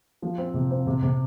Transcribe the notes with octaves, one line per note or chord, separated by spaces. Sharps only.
F3
C4
C3
C4
C3
C3